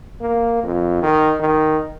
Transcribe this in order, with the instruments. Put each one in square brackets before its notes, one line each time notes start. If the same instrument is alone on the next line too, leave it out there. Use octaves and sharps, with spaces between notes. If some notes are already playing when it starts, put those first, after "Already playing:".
[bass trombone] A#3
F2
D#3
D#3